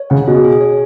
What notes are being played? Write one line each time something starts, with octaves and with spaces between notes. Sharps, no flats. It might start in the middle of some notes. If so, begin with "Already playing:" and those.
Already playing: C#5
C#3 F#5
B2 G#4
G#4
C#5